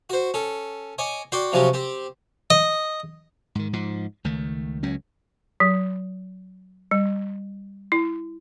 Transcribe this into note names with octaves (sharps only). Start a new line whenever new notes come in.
F#4 C5
C#4 A4
C#5 D#5 G#5 D6
F#4 D5 G5 C6
C3 F3 F#3 C#4 F#4 G4
C4 G4
D#5
G#2 D#3
G#2 F3
C#2 D#3 A3
C#2 F#3 C#4
F#3
G3
E4